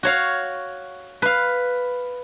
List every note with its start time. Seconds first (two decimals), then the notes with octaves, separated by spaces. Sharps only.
0.03 F#4 C#5 F5
1.22 B4 F5